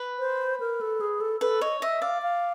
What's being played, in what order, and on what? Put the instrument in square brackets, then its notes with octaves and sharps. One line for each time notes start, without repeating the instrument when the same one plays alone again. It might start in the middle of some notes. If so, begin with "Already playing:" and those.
Already playing: [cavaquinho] B4
[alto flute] C5
A#4
A4
G#4
A4
[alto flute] A4 [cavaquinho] B4
[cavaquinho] C#5 [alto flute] D#5
[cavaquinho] D#5 [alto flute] E5
[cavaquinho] D5 [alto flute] F5
[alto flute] F5